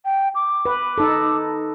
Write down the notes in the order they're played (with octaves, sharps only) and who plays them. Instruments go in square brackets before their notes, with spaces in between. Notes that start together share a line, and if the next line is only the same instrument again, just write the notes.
[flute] G5
D6
[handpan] B4
D#4 A4